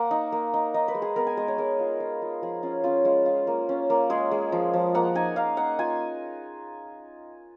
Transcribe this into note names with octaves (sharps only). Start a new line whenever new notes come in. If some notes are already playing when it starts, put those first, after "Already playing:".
Already playing: A#3 F#5
D#4
A#3
D#4
D#4 D#5
B4
G#3
G#4
B3 A#4
G#5
G#3 D#5
C#5
G#3 A#4
F4
F4
F4
F3 G#4
C#4 F4
C#4 F4
G#3 F4
F4
A#3
C#4
A#3
G#3 G#4
G#3
F3
F3
A#3 F#5
D#4 G#5
D#4 F5
D#4 F#5
F4 G#5